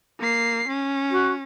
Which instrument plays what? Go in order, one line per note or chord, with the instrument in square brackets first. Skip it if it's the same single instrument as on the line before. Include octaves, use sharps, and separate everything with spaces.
[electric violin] A#3 C7
C#4
[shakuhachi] F#4